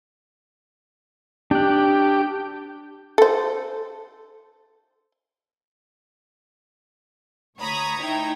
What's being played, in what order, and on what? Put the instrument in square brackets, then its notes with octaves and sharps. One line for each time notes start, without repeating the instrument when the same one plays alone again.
[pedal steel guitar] D4 F#6 [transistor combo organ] G4
[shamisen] A4 C5
[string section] D2 B5 D#6 [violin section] C#5 A#5 G#6
[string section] D#4 E4 G5